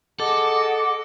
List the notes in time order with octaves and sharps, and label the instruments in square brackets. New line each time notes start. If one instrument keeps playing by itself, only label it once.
[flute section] G#4 D#5 F#5 [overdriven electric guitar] A4 [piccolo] D6